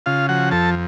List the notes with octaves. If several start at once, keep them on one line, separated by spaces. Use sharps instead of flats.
C#3 F4 F5
F3 F#4 F#5
F2 A4 A5